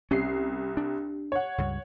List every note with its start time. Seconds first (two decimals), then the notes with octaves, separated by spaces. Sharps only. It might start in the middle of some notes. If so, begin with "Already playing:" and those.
0.11 C2 C#4 C7
0.77 D4
1.32 C#5 F#5
1.58 C#2 G2